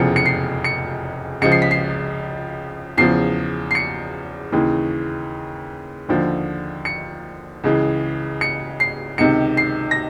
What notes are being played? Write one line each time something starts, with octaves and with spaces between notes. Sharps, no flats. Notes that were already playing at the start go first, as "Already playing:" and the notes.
Already playing: F1 E2 C#3 F3 C#7
C#7
C7
C#7
C#2 C#3 F3 C#7
C7
B6
C7
E2 C#3 F3 C7
C7
C#7
D#2 C#3 E3
D#2 D3 F3
C#7
C#2 C#3 E3
C#7
C7
C#2 C3 D#3 C#7
C7
A#6